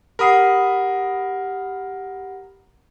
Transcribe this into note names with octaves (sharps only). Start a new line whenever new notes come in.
G4 A#4 F#5 B5 D#6 C7